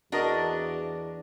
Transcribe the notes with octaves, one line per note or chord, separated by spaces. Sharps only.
E2 D4 F#4 A#4 D#5